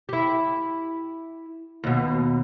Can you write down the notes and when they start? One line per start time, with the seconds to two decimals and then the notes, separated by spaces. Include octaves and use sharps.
0.09 E4 G4
1.84 D#2 B2